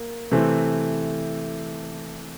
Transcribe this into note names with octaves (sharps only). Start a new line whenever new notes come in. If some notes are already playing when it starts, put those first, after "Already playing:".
Already playing: A#3
C3 E3 A3 C4